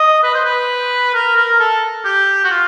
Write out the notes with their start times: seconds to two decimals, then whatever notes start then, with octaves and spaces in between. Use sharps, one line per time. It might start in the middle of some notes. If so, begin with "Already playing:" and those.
Already playing: D#5
0.23 B4
0.34 C5
0.44 B4
1.14 A#4
1.36 A#4
1.59 A4
2.05 G4
2.44 F#4
2.51 F4